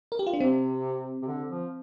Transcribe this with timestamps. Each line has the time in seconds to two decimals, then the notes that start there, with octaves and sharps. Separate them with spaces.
0.12 A#4
0.19 G4
0.27 F4
0.33 D4
0.41 C3 C4
1.22 C3
1.28 D3
1.50 F3